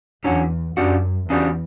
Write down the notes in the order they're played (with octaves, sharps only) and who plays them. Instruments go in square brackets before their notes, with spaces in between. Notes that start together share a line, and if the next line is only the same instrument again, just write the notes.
[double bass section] E2 [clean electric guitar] D3 F#3 C#4 F#4
[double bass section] F#2 [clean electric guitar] C#3 G3 D4 F#4
[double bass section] E2 [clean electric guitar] C#3 G3 D4 F#4